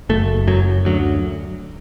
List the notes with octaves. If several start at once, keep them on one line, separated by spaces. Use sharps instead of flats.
F#1 A3
F#2 F#3
D2 F#3